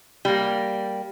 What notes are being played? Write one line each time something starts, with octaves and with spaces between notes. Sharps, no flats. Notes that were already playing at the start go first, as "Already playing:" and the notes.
G3 A#3